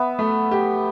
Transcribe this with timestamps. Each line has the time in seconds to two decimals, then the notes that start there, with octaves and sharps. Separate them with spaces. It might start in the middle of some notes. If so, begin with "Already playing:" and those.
Already playing: B3 E5
0.19 A3
0.51 G4